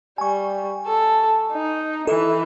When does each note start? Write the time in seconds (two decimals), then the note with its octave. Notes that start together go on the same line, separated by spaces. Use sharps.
0.18 G3 G#5 C#6
0.86 A4
1.52 D#4
2.07 E3 A4